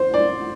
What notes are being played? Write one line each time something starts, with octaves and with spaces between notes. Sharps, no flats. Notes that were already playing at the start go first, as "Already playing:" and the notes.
Already playing: C5
D5